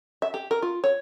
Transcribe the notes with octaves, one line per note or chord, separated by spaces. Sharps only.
E5
G4
A#4
F4
C#5